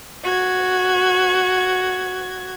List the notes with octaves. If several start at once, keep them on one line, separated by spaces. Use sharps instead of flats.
F#4 G#6